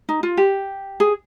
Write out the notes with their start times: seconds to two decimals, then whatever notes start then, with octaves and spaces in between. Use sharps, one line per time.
0.09 D#4
0.23 F4
0.37 G4
1.00 G#4